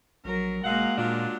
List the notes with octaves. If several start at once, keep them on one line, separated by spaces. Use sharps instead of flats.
A#1 F#3 A#4
E1 F#3 G#3 A#3 F5 F#5
A#2 F#3 D4 F4